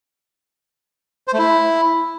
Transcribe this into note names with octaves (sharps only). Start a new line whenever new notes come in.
C5
A3
E4